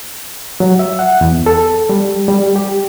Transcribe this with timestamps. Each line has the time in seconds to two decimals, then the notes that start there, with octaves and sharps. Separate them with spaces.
0.60 F#3
0.79 E5
0.99 F#5
1.21 E2
1.46 A4
1.89 G3
2.28 G3
2.56 G4